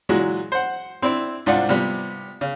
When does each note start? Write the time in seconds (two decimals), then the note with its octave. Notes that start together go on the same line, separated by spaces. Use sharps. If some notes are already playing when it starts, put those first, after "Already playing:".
0.09 A#2 E3 F#3 G#3 F#4
0.52 C5 F#5
1.02 C4 D4 E4
1.46 C2 G#2 D4 F4 F#5
1.69 C3 F3 G3 B3
2.41 C#3